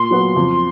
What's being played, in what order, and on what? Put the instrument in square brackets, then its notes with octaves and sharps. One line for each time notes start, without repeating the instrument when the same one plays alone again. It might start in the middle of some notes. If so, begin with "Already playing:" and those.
Already playing: [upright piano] A#2 [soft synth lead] C6
[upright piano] F#3 B3
F2